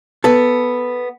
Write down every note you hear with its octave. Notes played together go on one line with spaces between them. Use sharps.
B3 A4